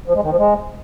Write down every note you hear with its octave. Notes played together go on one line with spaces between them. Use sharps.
F3
G#3
D#3
F3
G#3